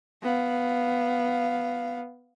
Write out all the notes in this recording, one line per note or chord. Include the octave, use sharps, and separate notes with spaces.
B3 F5